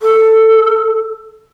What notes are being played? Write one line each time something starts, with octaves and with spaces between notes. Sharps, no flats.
A4